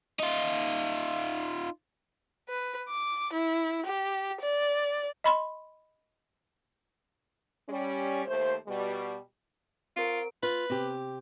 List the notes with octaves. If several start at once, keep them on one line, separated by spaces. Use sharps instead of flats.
D#4 F4
B4
D6
E4
G4
D5
D#5 B5 C6
G3 C#4
D#2 A3 C5
B2 G3
C4 F4 A#4 D7
F4 B4
C3 G4